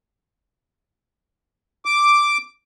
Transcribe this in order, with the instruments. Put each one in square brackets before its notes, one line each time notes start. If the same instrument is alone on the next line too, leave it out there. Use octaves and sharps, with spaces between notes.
[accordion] D6